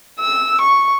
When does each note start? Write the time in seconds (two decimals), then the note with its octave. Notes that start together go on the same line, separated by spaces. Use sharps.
0.20 E6
0.61 C#6